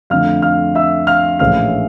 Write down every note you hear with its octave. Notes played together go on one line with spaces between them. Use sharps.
F2 D3 A3 F5 F6
F5 F6
E5 E6
F5 F6
A#1 A2 E3 A3 C#4 F5 F6